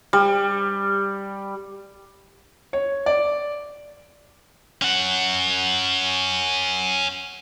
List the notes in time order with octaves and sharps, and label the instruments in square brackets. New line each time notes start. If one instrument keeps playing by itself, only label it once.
[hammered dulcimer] G3
[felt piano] C#5
D5
[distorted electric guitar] C#4 F#5